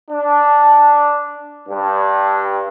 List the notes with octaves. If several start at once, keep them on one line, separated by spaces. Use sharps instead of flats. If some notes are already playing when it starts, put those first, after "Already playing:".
D4
G2